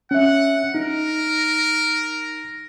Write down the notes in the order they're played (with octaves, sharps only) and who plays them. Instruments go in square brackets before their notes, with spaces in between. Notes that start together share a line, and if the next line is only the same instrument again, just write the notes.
[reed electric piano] C#4 E5 [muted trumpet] F#5
[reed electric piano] D#4 [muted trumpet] A#4